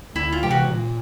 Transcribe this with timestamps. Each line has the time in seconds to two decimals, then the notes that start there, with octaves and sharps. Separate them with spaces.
0.15 D2 E4
0.32 F4
0.42 C3 E3 G#3 G4
0.51 F#4
0.69 A#2